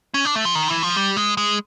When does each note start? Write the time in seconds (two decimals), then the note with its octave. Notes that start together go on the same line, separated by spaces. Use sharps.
0.14 C#4
0.25 D4
0.35 A3
0.45 F3
0.55 D#3
0.68 E3
0.83 F3
0.96 G3
1.17 G#3
1.37 G#3